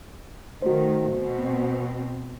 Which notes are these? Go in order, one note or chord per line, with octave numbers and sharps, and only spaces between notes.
D#3 A3 F#4 C5
B2 C4